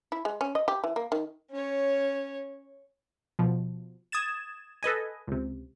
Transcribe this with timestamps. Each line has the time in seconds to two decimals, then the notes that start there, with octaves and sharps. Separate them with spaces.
0.12 E4
0.25 G#3
0.41 C#4
0.55 D#5
0.68 G4
0.84 E3
0.96 A#3
1.12 D#3
1.51 C#4 C#5
3.39 B2 F3
4.12 D#6 G#6 A6 E7
4.83 A4 B4 D#5 G#5
5.27 C#2 C3